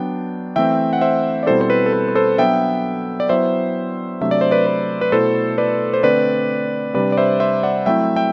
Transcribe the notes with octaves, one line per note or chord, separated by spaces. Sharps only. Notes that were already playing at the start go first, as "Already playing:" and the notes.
Already playing: F#3 B3 D4 G5
E3 A3 C4 E5 G5
F#5
C5 E5
D5
B2 G3 C4 E4 A4 C5
C5
B4
A4
B4
B4
A4 C5
F#3 B3 D4 E5 G5
D5
F#3 B3 E4 C5 E5
C3 F#3 A3 D4 E5
D5
C5
B4 D5
B4
B4
B2 A3 E4 A4 C5
B4 D5
C5
D3 A3 C4 B4 D5
C3 G3 D4 B4 D5
D5
C5 E5
C5 E5
D5 F#5
F#3 A3 C4 E4 E5 G5
E5 G5